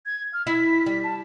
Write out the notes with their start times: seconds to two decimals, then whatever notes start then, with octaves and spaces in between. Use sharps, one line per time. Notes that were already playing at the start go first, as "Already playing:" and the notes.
0.06 G#6
0.33 F6
0.47 E4 B6
0.86 G3
1.04 A5